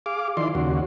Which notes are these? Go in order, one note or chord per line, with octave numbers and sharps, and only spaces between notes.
G#4 F5 D6
D#3 F3 E4 D5 C6
D#2 C#3 F#4